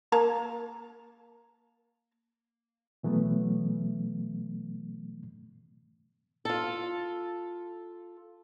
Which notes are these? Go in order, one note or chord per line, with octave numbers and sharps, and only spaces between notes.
A#3 A5 A#5
B2 E3 F#3 A3 B3
F4 A4